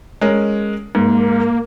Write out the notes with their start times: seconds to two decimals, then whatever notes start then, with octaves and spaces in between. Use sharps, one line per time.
0.21 G#3 C#4 A#4
0.95 G#2 A#3